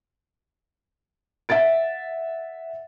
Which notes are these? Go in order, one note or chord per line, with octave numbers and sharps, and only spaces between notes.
E5 F#5 A6 D7